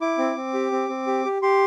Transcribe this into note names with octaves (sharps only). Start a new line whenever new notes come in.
E4 D6
C4
C4
G4
C4
C4
G4
G4
G4 C6